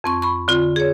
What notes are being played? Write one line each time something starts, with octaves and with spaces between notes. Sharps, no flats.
F2 C4 C#6
B5 C#6
D3 C4 F4
G#4 C#5